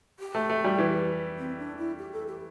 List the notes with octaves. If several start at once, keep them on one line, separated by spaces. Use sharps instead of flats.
G4
A3
A3
G3
E3
C4
D4
E4
G4
A4
G4